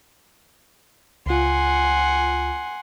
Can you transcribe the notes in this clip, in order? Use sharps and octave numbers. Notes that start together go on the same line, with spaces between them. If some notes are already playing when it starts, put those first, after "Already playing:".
C#2 F4 F#5 G#5 C6